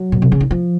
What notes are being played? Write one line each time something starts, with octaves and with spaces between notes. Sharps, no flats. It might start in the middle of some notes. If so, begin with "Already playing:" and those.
Already playing: F#3
A#2
C3
C#3
D#3
F3